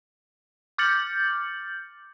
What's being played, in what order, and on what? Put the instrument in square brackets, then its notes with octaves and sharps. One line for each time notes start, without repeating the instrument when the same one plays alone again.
[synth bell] D6 F6 G6 A6 C#7 F#7